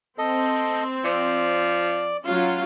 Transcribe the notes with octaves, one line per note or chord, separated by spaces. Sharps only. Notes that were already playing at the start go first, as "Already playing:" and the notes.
C4 A4 D#5
F3 D5
F#3 C#4 F4